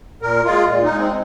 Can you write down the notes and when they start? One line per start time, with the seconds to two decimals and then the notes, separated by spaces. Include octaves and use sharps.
0.22 A#2 A#4
0.45 G#3 F4
0.68 A#2
0.83 D#4
0.91 G#3
0.98 C4